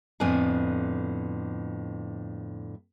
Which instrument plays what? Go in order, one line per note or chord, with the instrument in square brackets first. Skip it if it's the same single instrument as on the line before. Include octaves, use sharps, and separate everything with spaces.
[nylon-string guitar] F2 A2 D3 B3 G#5